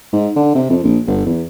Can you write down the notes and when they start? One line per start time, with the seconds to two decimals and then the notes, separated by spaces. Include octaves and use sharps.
0.13 G#2
0.36 D3
0.55 C3
0.70 F2
0.83 A#1
1.07 G1
1.26 E2